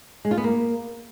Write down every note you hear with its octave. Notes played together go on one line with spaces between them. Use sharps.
G#3
F4
B3
A#3